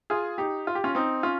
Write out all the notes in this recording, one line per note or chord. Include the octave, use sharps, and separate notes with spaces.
F4 G#4
D#4 G4
F4
G4
C#4 F4
C4 D#4
C#4 F4